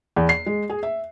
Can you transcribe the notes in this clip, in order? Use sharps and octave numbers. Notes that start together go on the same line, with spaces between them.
E2
C7
G#3
G#4
E5